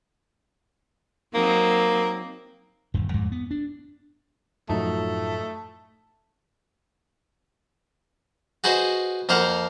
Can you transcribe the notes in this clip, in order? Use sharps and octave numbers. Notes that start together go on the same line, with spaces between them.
F#3 A#3 C4 D#4
D#1 G2 D3
F2 G#2
B3
D4
F#2 A2 F3 F#3 A3 D#4
F#4 G#4 B4 C5 D#5
F2 A#3 C5 F5 F#5